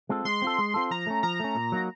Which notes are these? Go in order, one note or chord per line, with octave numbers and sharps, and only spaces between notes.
G#3 C4 F4 A4
G#3 C6
C4 F4 A4
G#3
C4 F4 A4
F3 A#5
A3 C#4
F3 A#5
A3 C#4
A#2
F#3 A#3 D#4 F#4